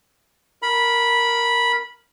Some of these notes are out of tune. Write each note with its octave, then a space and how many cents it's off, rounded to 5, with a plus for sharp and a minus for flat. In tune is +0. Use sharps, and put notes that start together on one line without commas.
A#4 +0 B5 -10